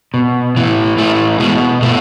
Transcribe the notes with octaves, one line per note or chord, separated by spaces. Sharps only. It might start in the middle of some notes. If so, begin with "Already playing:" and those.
B2
A2 E3
A2 E3 A3
B2 G#3
B2 A3